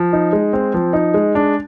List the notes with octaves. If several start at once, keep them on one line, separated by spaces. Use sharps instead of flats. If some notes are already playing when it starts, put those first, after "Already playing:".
Already playing: F3
D#4
G#3
C4
F3
D#4
G#3
D4